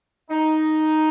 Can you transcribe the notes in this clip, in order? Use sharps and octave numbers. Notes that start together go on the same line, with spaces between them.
D#4